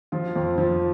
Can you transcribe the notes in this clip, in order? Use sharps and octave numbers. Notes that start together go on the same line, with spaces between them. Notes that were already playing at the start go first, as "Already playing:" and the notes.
F3 F4
F2
F3